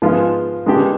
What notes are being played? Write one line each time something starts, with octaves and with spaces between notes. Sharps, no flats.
G#2 F3 G#3 B3 F4
D#3 G#3 B3 D4 G4